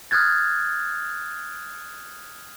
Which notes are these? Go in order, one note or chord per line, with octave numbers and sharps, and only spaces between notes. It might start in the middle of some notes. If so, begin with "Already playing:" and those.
D#6 F6 F#6 G#6 A6